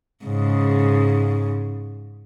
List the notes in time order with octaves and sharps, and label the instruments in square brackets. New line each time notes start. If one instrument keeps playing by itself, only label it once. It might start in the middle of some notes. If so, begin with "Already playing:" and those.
[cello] G#2 C#3